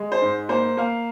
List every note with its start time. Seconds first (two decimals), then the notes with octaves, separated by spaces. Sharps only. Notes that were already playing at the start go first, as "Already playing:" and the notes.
Already playing: G#3
0.12 C5
0.22 G#2
0.49 A#3 C5
0.77 A#3 F5